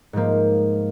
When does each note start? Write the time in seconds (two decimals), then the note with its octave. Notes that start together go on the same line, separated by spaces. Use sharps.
0.13 G#2 F3 A#3